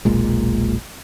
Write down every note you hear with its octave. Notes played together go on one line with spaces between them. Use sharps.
E1 B1 A#2 G#3